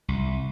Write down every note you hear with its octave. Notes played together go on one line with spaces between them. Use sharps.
C2